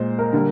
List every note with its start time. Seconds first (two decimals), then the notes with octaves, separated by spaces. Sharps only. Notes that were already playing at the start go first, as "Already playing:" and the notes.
Already playing: A#2 G#3 C5
0.19 A#4
0.33 D3 G3 A#3